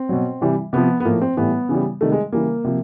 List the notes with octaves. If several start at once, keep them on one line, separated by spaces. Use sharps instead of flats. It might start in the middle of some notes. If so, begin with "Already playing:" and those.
Already playing: C4
B2 F#3
C3 E3 G3
C3 F3 B3
B3
A2 F3 A#3
C4
A2 E3 G3 B3
C#3 E3 G3
C3 D#3 G3 A3
G#3
C#3 E3 G3 A#3
C3 F3